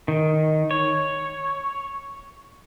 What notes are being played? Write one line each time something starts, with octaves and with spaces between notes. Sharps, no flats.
D#3
C#5